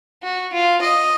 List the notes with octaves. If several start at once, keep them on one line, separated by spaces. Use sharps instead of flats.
F#4
F4
D#5